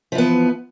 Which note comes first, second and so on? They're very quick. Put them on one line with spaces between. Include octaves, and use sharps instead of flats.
F3 E3 B3